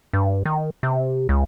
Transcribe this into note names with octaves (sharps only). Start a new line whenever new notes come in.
G2
D#3
C3
C#2